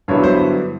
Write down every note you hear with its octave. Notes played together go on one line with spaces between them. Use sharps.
G2 D3 F#3 B3 E4 C#5
C5